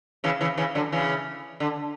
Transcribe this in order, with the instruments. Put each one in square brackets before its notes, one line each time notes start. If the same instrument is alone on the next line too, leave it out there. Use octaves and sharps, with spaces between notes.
[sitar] C#3 E3
C#3 E3
C#3 E3
D3 F#3
C#3 E3
D3